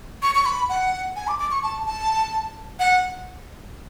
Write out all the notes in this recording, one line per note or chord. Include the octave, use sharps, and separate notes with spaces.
C#6
C#6
B5
F#5
G#5
D6
D6
C#6
A5
A5
F#5